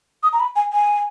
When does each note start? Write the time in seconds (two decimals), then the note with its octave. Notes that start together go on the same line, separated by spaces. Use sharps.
0.23 D#6
0.33 A#5
0.40 B5
0.56 G#5
0.73 G#5